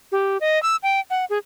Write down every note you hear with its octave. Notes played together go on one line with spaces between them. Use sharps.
G4
D#5
E6
G5
F#5
G#4